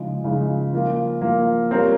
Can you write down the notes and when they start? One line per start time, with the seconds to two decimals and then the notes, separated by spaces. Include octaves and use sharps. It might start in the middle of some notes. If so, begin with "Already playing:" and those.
Already playing: C#3 F3 G#3 D#4
0.24 C#3 F3 G#3 D#4
0.73 F3 A#3 F4
1.21 F3 A#3 F4
1.71 G3 C4 F4 A#4 C#5